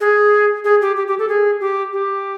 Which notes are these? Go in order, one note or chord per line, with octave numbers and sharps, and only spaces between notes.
G#4
G#4
G4
G4
G4
A4
G#4
G4
G4